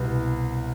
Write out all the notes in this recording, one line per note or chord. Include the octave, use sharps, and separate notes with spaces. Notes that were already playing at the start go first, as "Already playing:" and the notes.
Already playing: C2 B2 B3 E4